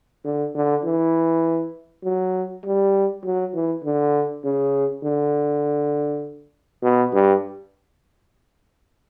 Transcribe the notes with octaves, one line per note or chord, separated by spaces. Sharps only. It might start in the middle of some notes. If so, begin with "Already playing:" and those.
D3
D3
E3
F#3
G3
F#3
E3
D3
C#3
D3
B2
G2